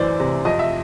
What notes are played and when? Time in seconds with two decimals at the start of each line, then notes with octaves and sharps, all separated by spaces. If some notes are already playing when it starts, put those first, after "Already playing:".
Already playing: F#2 E3 C5 D5
0.20 C3
0.45 F2 D#5
0.59 E5